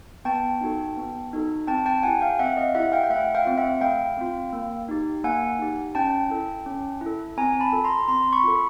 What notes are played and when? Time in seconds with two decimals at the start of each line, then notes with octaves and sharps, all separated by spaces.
0.25 B3 G5 A5
0.61 D#4 F#4 A4
0.97 B3
1.33 D#4 F#4 A4
1.67 C4 G5 A5
1.86 G5 A5
2.03 E4 G4 F#5 G#5
2.21 F5 G5
2.39 C4 E5 F#5
2.57 D#5 F5
2.75 E4 G4 E5 F#5
2.92 F5 G5
3.03 G5
3.10 A3 E5 F#5
3.35 F5 G5
3.45 C4 F4
3.58 E5 F#5
3.81 A3 F5 G5
4.18 C4 F4
4.53 A#3
4.88 D#4 G4
5.24 A#3 F#5 G#5
5.59 D#4 G4
5.95 C#4 G5 A5
6.30 E4 A4
6.66 C#4
7.01 E4 A4
7.38 C4 G#5 A#5
7.60 A5 B5
7.72 F4 A4
7.84 A#5 C6
8.08 C4 A#5 C6
8.33 B5 C#6
8.44 F4 A4